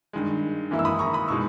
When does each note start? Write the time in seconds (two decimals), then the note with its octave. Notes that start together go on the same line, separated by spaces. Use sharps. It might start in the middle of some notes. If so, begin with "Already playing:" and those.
0.13 G2 D#3 G#3
0.71 G#2 E3 A#3 E4
0.79 E6
0.85 B5 D#6
0.99 A#5 C#6
1.13 B5 D#6
1.28 B2 G#3 D#4 C#6 E6